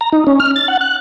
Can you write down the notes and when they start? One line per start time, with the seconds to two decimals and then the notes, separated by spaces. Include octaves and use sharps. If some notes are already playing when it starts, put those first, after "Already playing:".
0.01 A#5
0.12 D#4
0.27 C#4
0.40 F6
0.56 A6
0.68 F#5
0.81 F#6